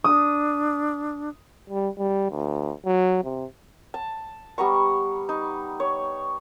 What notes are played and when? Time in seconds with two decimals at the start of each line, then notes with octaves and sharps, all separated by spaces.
0.04 D4 D#6
1.70 G3
1.98 G3
2.31 D2
2.86 F#3
3.25 C3
3.94 A5
4.58 G3 B3 A#5 C#6
5.29 D#4
5.80 C#5